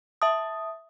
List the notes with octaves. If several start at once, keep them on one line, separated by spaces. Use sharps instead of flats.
E5 A5 D#6